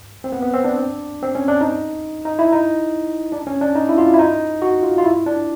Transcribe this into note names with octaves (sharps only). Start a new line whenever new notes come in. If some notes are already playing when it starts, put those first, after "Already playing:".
C4
B3
B3
C4
D4
C4
C#4
D4
D#4
D#4
E4
D#4
D4
C#4
D4
D#4
E4
F4
E4
D#4
F#4
F4
F4
E4
D4